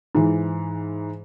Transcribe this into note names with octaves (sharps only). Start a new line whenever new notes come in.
G#2 E3